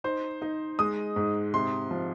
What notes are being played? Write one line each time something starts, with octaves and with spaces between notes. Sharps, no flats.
D#4 C5
D#4
G#3 D#6
G#2
C3 C6
F3